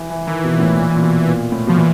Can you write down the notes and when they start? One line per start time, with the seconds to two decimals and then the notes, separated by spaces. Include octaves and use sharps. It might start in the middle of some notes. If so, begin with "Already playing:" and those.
Already playing: E3
0.10 E3
0.27 D#3 E3
0.44 B2
0.54 A#2
0.60 A2
0.77 A#2
0.96 A#2
1.02 B2
1.28 A#2
1.52 A2
1.67 B2 F3
1.77 A#2 E3